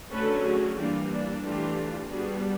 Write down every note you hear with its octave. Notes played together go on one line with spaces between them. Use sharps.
D3 F#3 A3 C#4 A4 B4
F#4 G#4
E3 G3 A#3 D4 F4 G4
D4
E3 A3 D4 F4 G4
G3 B3 D4 F#4 G#4